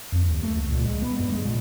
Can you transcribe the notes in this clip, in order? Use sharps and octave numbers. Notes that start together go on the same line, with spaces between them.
F2
D#2
A3
C#2
A#2
G#3
B3
G2
G#3
A#2